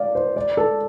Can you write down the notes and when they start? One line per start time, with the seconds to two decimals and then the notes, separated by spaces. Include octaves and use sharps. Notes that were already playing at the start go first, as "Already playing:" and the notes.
Already playing: D5 F5
0.15 C5
0.36 D5
0.57 A4